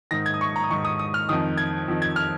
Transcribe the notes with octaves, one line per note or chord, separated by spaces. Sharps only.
G#2 D#3 A#6
G#6
D#6
C#6
A#5
D#6
G#2 D#3 C#6
D#6
D#6
F6
F2 D#3 D#6
G#6
F2 D#3
G#6
F6